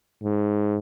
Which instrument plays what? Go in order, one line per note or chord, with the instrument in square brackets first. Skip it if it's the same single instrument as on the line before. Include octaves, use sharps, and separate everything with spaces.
[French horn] G#2